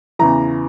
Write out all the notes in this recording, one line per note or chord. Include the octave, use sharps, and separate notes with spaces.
E2 C#3 E3 A#5